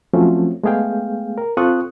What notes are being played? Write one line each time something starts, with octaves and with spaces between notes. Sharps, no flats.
F3 F#3 A3 C4 C#4
G#3 A3 B3 G#4 F5 G5
A#4
C4 F4 A4 C#6 D#6 F#6